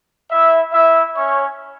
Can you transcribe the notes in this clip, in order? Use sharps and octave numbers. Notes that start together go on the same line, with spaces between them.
E4 E5
E4 E5
C#4 C#5